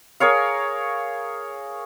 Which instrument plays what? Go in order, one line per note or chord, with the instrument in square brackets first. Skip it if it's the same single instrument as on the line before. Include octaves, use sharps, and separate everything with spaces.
[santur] G#4 A#4 C#5 F5